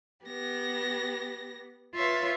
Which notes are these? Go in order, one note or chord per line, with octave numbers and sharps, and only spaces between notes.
B3 G4 A#6
F4 B4 C#5 E5 F5